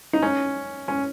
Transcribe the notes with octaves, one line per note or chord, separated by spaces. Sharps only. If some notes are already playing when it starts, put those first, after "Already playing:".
D#4
C#4
C#4